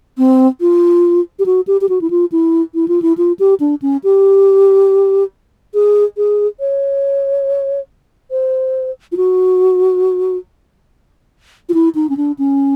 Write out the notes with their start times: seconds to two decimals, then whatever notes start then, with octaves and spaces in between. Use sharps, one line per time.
0.18 C4
0.61 F4
1.39 G4
1.46 F#4
1.67 G4
1.81 G4
1.89 F#4
2.01 E4
2.10 F4
2.32 E4
2.75 E4
2.88 F4
3.02 E4
3.18 F4
3.39 G4
3.60 D4
3.82 C#4
4.04 G4
5.74 G#4
6.17 G#4
6.60 C#5
8.31 C5
9.12 F4
9.17 F#4
11.69 F4
11.74 E4
11.95 D#4
12.09 C#4
12.17 D4
12.38 C#4